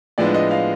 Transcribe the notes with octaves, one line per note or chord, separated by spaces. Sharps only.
A2 F3 G#3 B3 D4 D5
D#5
F5